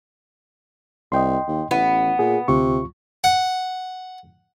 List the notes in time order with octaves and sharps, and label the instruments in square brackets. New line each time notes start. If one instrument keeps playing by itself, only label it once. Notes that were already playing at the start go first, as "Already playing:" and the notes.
[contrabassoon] C2 [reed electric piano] D#5 G5 C6
[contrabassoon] D#2
[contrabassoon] A1 [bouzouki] B3 [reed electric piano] E4
[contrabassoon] A#2 [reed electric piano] G#4
[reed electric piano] D2 F4 C#6 [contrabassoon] C3
[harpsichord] F#5